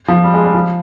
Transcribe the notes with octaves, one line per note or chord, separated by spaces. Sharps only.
F3
G3
G#3
G3
F3